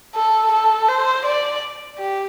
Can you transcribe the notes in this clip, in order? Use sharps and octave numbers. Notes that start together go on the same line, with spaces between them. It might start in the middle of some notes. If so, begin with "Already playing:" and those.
A4
A4
C5
D5
G4